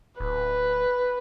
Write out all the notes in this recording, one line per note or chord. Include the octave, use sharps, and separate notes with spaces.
D1 B4